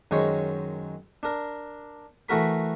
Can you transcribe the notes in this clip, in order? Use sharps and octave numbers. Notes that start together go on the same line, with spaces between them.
F#2 D#3 G#3 C5 C#5
D4 A#4
E3 A3 F#4 A#4 B5